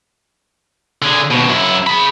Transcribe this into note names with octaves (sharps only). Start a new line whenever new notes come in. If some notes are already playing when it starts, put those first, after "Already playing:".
D3 G#4
D#2 B2
F#2 E4
G#4 B5